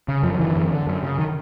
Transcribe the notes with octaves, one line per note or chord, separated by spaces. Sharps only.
C#3
F#2 F3
D3 E3
F#2
D3
F#2
C#3
D#3